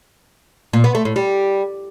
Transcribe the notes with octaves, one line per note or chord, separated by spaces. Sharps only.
A#2
B3
A3
A2
G3